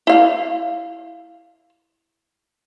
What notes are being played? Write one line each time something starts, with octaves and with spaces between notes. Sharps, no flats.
E4 F5